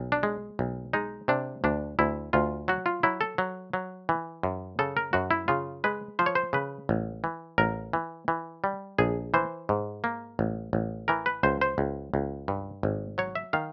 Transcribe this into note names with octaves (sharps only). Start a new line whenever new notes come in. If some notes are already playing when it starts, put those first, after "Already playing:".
Already playing: B1
D4
G#3
B1
G#3 D#4
C3 D4
D2 D4
D2 E4
D2 F4
F#3 F#4
F4
F#3 E4
A4
F#3
F#3
E3
F#2
C#3 A4
A#4
F#2 F#4
E4
C#3 F4
G#3 B4
F3 C5
C#5
C5
C#3 B4
A1
E3
A1 A#4
E3
E3
G3
A#1 G#4
E3 C5
G#2
A#3
A1
A1
E3 A#4
B4
C#2 C5
C5
C#2
C#2
G2
G#1
F#3 C#5
E5
D#3 F5